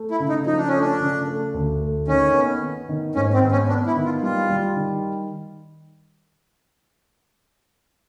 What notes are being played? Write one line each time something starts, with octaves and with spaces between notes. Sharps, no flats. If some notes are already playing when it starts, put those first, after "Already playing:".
Already playing: A3
E4
C#3
D#4
F3 D#4
D4
A3 C#4
D4
C#3
A3
D2
A3
D#3 C#4
B3
B3
D#3
G#2 C#4
C4
B3
C#4
B3 D4
E4
D#3
F4
G3 F4
G3
D#3